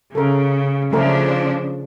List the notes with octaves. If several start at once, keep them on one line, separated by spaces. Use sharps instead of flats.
C#3 A4 A#4
C#3 F3 A3 D4 A#4